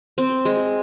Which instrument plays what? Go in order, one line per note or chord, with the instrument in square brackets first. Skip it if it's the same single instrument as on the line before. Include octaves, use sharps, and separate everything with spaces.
[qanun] C4
G#3